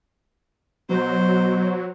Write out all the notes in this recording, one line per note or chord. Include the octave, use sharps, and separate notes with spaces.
B2 F#3 C5